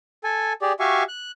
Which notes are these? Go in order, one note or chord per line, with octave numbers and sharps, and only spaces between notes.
A4 G#5
G4 G#4 D5
F#4 G4 E5 F5 G#5 C#6
F#6